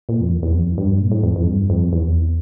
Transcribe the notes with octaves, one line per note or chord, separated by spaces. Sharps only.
A#2
F2
E2
E2
F2
G2
A#2
A2
F2
F2
G2
F2
E2